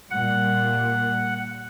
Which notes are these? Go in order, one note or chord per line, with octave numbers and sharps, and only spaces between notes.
A#2 G3 F#5